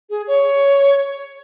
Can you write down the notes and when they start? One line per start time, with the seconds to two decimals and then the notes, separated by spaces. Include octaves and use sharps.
0.10 G#4
0.27 C#5